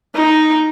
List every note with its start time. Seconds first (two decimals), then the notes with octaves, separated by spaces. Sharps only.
0.15 D#4